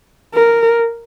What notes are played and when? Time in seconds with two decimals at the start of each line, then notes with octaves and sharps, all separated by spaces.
0.34 A#4